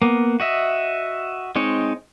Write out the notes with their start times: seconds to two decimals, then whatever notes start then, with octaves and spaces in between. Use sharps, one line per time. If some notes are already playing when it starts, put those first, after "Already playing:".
0.02 A#3 B3
0.40 F#4 D#5 E5
1.56 G#3 C4 D#4 C#5